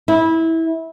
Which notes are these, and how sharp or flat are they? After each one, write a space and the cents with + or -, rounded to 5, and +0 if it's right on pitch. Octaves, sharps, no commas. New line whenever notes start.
E4 -20